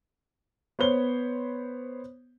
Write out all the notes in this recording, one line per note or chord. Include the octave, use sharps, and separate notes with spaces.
B3 C5 C#5 B5 G7